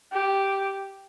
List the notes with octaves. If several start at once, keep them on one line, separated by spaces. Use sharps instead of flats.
G4